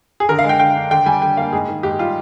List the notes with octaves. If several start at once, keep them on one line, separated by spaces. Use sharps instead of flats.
G#4
D3 A#4
F5
G#3
G5
D3 G5
D4
D3 G5
G3 G#5
D3 G5
A#3 F5
G#2 G#4
D#3
G#2 G4
G3 F4